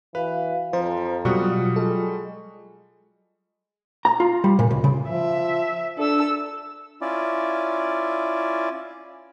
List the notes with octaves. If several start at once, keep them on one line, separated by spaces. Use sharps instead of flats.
E3 F#4 B4 F5
F2 F3 C5 A#5
B2 F#3 G3 F4 F#4 C#6 D#6
G#3 A4
A#5
F4
G3
A#2
C#2
C#3
F3 E5
D4 A4 E6
C#4 E4 F4 D5